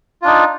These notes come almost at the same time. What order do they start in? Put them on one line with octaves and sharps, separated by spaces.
F4 D4 D#4